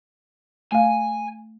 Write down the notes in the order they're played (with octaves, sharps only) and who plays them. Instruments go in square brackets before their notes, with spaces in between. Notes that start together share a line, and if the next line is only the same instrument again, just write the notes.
[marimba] A3 F5 [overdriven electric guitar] G#5